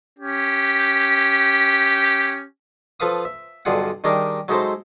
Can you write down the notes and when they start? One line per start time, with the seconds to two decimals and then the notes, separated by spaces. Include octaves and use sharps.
0.19 C#4 G4
3.00 F3 A4 B4 F5 D#6
3.25 E5
3.65 B1 G2 D3 F4 G#4 F#5
4.04 D#3 G3 D4 D#4 G#4 A#4
4.48 F#3 G#3 D#4 E4 A4 C5